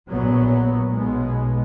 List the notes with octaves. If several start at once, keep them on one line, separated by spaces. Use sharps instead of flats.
A#1 A#2 F#3 B3
B1 B2 G#3 B3